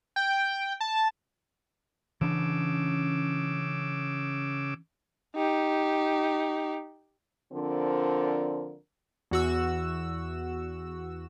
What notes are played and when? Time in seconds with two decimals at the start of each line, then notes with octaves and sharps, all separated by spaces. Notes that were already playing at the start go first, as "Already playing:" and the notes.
0.16 G5
0.80 A5
2.21 C#3 E3 C#4 D4 D6 E6
5.36 D#4 G4
7.53 D3 F3 C4 D4 A#4
9.31 E2 F#4 E6